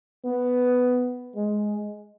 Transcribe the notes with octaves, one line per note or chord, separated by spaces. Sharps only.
B3
G#3